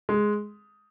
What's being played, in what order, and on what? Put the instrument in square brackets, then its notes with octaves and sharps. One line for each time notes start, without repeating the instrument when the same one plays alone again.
[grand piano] G#3